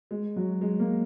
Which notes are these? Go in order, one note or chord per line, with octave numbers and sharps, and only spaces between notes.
G#3
F#3
G#3
A#3